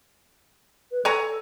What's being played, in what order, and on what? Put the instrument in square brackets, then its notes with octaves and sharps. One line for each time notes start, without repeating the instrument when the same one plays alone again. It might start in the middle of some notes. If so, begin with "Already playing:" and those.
[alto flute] B4
[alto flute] A4 [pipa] C#5 G#5 A#5